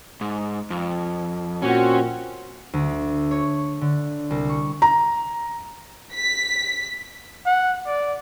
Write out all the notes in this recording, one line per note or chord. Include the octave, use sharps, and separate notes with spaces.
G#2
F2
A#2 C4 C#4 F#4
D2
C#5
D3
C2
C#6
A#5
B6
F#5
D5